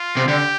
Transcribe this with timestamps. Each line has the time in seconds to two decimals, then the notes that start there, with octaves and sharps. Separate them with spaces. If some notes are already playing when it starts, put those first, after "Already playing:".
Already playing: F4
0.17 C3
0.28 D3 G4